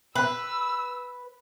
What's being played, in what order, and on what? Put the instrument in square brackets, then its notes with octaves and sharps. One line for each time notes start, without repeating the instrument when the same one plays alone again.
[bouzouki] B4 [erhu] E6